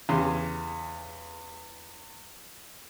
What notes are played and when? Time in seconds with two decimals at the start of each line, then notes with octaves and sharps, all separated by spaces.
0.09 E2 C#3 G4 C6